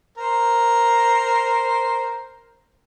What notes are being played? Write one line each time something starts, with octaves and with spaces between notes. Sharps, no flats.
A#4 C5